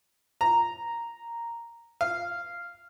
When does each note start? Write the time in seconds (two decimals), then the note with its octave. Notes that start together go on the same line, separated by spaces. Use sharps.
0.41 A#5
2.01 F5